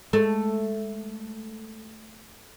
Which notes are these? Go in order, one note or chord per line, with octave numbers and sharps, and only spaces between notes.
G#3 A3